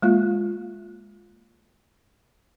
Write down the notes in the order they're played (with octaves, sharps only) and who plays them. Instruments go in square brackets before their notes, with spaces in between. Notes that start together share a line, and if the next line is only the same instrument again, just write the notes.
[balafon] G#3 A#3 F4